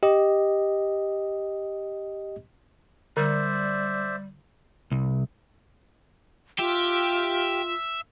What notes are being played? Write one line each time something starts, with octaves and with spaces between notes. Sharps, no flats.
G4 D#5
D3 G3 C5 D5 E5
C2
F4 G4 E5